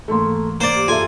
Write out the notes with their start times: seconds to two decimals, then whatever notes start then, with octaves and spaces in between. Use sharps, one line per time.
0.08 G#2 E3 A3 A#3 C6
0.60 A#3 C5 D5
0.76 G4
0.88 F#2 F4 A4 E5 G#5 C6